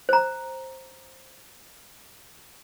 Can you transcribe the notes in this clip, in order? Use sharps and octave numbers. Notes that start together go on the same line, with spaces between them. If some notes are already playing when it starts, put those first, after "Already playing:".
C5 A#5